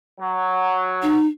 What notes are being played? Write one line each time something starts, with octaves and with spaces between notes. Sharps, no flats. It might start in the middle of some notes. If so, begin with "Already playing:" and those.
F#3
D#4